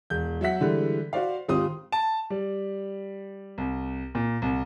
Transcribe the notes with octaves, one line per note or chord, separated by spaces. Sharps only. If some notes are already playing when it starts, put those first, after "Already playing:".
E1 G6
F#3 E5 F#5 B6
D3 E3 G3 G#3
F#4 C5 D5 F5
G#1 C4 F4 G4 C5 D#6
A5
G3
C2
A#2
C2